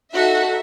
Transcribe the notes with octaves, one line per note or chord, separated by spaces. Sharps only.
D#4 F#4 A4 E5